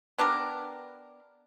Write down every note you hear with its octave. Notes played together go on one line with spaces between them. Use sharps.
B3 D4 G4 A#4